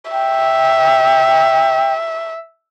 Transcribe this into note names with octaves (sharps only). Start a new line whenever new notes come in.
E5 G5